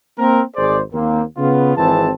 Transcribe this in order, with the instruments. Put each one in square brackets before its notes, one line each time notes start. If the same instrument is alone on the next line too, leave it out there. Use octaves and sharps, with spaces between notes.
[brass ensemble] A#3 C4 A#4
G#1 G#4 C5 D5
D#2 A#3 C4
C#3 B3 F4
G#1 E3 C4 G#4 A5